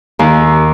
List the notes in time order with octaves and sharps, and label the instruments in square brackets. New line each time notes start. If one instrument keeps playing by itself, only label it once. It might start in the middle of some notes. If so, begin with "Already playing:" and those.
[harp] D#2